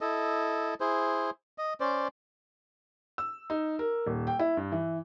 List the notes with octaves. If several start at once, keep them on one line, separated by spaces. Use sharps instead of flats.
E4 A4 D#5
E4 G#4 C5
D#5
C#4 C5 D5
E6
D#4
A#4
D#1
G5
E4
G2
E3